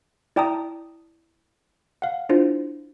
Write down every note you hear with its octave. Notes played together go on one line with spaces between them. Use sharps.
E4 D5 G5 A5 A#5 D#6
F5 F#5
D4 E4 F4 C5